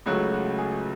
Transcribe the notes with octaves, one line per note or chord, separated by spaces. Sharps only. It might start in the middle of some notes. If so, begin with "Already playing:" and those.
C#2 C#3 F#3 A3 F#4
F#4
G#4